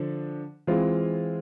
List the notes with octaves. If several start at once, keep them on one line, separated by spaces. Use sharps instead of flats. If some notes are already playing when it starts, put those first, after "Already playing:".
Already playing: D3 F3 D4
E3 G#3 C4 F4